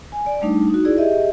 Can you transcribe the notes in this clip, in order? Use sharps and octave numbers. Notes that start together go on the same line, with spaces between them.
G#5
D5
G3 A3 D4 D#4
D#4 F#4
E4 G#4 D5
G4 G#4 D#5 E5